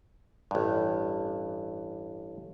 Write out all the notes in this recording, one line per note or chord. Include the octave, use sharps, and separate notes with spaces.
A1 G2